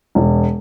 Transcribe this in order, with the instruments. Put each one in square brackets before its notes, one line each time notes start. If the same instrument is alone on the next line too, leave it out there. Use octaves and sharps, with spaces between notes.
[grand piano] E1